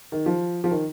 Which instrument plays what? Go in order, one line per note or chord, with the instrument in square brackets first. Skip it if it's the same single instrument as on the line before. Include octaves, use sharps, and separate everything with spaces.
[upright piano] D#3
F3
F3
D#3